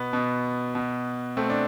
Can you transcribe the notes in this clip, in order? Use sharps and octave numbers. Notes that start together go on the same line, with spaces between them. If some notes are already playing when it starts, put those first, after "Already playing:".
Already playing: B2 B3
B2
B2
B2 A3 C4
D4